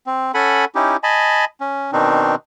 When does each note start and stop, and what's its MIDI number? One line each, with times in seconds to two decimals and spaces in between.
0.07 0.32 60
0.34 0.65 61
0.34 0.65 69
0.34 0.65 78
0.34 0.65 80
0.34 0.65 83
0.75 0.97 61
0.75 0.97 63
0.75 0.97 64
0.75 0.97 67
1.03 1.45 75
1.03 1.45 80
1.03 1.45 81
1.03 1.45 83
1.61 1.91 61
1.93 2.35 47
1.93 2.35 51
1.93 2.35 60
1.93 2.35 62
1.93 2.35 63